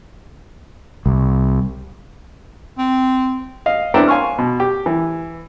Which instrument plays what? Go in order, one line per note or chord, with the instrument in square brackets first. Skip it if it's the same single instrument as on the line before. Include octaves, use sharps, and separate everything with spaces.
[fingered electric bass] C2
[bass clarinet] C4
[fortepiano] D#5 F5
B3 C4 D4 E4 G5 A#5
F5 G#5 C6 C#6 F6
B2
G4
E3